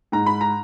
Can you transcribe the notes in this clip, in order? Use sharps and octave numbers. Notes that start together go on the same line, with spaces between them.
G#2 A#5
B5
A#5